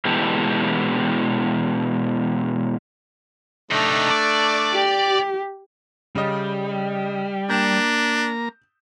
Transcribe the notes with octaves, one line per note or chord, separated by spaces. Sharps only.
B2 E3 G#3 E4 G4 A4
C3 A3 D4 D#4
D5
G4
C#3 G3 D#5
A#3 D4 A#5 G6 E7